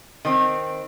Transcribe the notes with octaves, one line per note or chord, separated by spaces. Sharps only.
D#3 C4